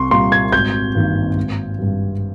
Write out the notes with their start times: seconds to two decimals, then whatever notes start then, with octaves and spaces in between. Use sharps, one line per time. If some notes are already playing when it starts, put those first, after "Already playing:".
Already playing: C2 C6 C#6
0.11 A#2 G3 A#3 C6
0.32 G#6
0.52 G#1 G6
0.95 G2 D#3 A#3
1.37 G#1
1.79 G2 G3